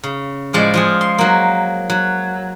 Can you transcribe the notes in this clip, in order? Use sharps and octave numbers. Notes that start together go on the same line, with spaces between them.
C#3
A2 F3 G#3 D5
F3 F4 G#4
C6
F#3 A#3
F#3